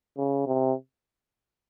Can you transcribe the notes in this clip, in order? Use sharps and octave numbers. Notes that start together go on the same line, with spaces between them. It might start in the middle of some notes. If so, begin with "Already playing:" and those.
C#3
C3